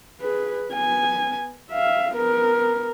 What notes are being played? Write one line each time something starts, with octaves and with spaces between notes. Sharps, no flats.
G#4 B4
B3 G#5
E5 F5
B3 A#4